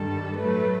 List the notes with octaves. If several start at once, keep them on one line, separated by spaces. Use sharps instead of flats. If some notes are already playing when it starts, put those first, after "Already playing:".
Already playing: G2 D#3 G3 A4
A2 F#3 A3 B4